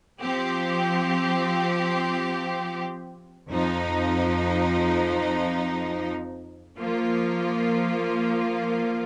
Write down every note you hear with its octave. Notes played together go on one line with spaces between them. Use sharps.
F3 C4 G4
F2 F3 D#4
F3 A#3 F4